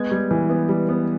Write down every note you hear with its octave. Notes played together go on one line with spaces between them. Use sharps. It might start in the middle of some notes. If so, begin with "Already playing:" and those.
Already playing: G#3 B3 G#6
G3
E3
B3
G3
B3